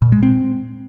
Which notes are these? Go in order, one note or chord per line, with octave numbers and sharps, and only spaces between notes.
A#2
G#3
C4